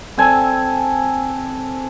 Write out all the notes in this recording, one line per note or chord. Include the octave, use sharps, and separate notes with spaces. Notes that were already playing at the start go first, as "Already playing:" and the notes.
C4 A4 G#5 A5